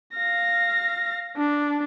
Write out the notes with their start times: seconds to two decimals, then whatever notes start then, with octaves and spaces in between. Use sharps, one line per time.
0.15 F5 A#6
1.37 D4